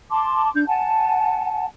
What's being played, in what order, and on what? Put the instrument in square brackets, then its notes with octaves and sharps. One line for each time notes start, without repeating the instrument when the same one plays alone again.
[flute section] A5 C6 D6
D4 G6
F#5 G#5 A5